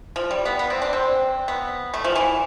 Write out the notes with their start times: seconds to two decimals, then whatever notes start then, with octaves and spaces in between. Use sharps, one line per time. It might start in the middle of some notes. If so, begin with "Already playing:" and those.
0.16 F3
0.31 G3
0.45 B3
0.59 B3
0.70 C4
0.82 D4
0.93 C4
1.48 B3
1.94 A3
2.04 F3
2.15 E3